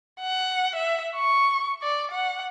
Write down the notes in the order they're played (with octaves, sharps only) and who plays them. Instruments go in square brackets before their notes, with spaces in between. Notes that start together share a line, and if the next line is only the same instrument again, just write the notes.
[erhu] F#5
E5
C#6
D5
F#5